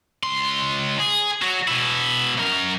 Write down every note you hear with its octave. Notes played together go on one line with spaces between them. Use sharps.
C#2 C6
G#4
F#3 F#4
B2 E4
F#2 A#4